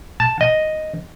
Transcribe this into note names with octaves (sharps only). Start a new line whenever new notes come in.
A5
D#5